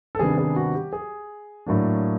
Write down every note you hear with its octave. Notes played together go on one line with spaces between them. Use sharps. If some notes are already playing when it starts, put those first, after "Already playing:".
A4
C3 D#3 G3 B3 D4 G#4
G#4
F#4
G4
G#4
A2 F#3 A#3 D4